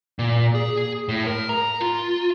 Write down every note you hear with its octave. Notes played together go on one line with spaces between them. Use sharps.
A#2
G#4
A2
A#4
A#5
F4